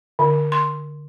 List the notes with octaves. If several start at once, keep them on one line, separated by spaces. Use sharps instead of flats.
D3
C6